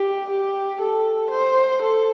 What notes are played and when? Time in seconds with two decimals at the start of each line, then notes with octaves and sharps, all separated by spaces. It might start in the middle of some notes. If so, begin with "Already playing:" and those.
Already playing: G4
0.30 G4
0.81 A4
1.31 C5
1.82 A4